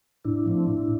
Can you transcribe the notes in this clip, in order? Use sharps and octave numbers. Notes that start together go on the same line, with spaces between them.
A2 D4 E4
F3 A3 C4
A2